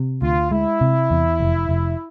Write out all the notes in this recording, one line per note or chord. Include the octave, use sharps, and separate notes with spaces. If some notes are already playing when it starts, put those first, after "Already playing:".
Already playing: C3
D2 F4
G#3 E4
C3
E2
F1
F1